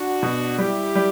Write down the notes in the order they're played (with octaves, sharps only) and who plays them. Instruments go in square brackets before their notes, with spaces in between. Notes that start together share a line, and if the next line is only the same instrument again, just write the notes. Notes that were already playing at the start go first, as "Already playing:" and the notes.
Already playing: [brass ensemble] D4 F#4
[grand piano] B2
[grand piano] G3 [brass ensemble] E4 G4
[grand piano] G3